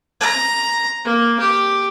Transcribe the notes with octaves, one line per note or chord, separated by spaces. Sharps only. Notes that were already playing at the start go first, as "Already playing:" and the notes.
A#5
A#3
G4